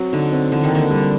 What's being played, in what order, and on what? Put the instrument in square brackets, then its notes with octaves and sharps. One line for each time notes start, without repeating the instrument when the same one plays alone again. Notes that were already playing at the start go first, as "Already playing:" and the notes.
Already playing: [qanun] F#3 [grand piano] C4 F#4
[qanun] D3 [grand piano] D#4
[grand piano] C4
[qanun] D3 [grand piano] E3
[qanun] D#3
[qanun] D3 [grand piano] A#3
[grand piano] G3